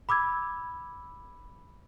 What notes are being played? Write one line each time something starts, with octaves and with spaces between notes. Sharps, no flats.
B5 D6 E6 G#6